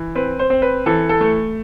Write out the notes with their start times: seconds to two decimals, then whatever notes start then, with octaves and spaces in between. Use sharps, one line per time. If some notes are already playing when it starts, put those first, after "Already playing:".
Already playing: E3
0.15 C4 B4
0.39 C5
0.50 C4
0.62 B4
0.86 E3 A4
1.09 A4
1.21 A3